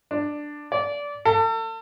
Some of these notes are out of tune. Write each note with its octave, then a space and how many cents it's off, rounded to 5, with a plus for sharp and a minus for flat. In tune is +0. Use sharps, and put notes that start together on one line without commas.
D4 +10
D5 -20
A4 +35